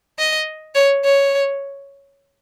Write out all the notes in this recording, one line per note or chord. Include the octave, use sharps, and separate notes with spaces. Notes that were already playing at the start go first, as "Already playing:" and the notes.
D#5
C#5
C#5